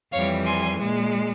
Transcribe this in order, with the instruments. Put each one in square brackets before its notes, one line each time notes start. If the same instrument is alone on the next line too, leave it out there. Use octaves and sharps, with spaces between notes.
[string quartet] F2 E3 G3 C#5 F5
G#5 C6
A#2 G#3